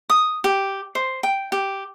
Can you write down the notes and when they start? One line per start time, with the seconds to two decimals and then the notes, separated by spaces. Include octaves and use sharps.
0.10 D#6
0.44 G4
0.95 C5
1.23 G5
1.52 G4